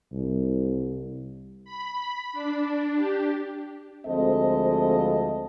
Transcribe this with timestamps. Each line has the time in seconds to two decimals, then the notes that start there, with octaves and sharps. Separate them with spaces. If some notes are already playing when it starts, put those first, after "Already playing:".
0.12 C2
1.65 B5
2.33 D4
2.96 G4
4.06 D2 F3 G#3 C4 A4 D#5